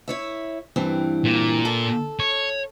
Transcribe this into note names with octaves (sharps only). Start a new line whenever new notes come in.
E4 C#5 E5
G2 E3 C4
A#2
A4
C#5